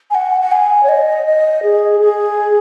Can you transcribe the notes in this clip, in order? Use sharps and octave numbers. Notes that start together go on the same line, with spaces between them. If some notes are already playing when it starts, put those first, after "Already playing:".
G#5
F#5
F#5
G#5
C#5
D#5
D#5
G#4
G#4